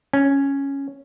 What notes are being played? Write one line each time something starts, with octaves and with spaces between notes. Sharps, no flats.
C#4